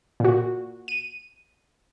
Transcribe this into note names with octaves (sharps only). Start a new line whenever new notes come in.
A#2 F#4
D#7